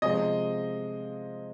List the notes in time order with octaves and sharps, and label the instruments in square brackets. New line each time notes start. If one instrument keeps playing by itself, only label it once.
[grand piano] C3 F3 G#3 C4 [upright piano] D#5